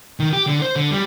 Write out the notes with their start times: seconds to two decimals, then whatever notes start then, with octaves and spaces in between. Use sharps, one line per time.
0.20 D#3
0.33 G4
0.47 D3
0.62 C5
0.76 D3
0.91 G3